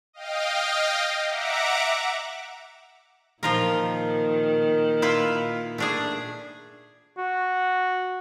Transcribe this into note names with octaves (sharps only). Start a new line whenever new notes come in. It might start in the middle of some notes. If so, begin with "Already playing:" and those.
D#5 F5 G5
E5 F#5 A#5 D6
A#2 D#3 F3 F4 A#4
E4 F4 B4
A3 D4 G#4
F#4